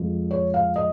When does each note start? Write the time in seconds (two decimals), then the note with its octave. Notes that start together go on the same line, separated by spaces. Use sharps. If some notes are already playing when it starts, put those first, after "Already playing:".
Already playing: F2 F3 G#3
0.31 C#5
0.54 F5
0.76 D#5